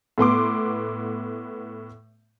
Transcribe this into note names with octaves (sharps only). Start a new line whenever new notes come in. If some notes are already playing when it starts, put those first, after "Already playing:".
A2 B3 C6 D6